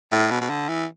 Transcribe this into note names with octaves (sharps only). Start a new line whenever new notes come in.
A2
B2
B2
D3
E3